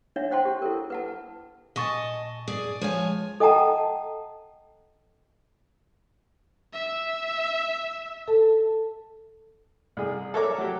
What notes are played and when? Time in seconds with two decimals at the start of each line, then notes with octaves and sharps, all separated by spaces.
0.16 D4 D#4 C#5 E5 F#5
0.31 D4 C5 F#5 G5 A5 C6
0.45 G4
0.62 E4 A4 A#4
0.90 B4 F#5 A5
1.76 A#2 D#5 G#5 A5 C#6 A6
2.48 G#4 D5
2.81 F3 G#3 C#5 G#5
3.40 A4 D#5 F#5 G5 A5 A#5
6.73 E5
8.28 A4 A5
9.97 C2 G#4
10.34 A4 A#4 C#5 E5 A#5 D6
10.58 F#3 G4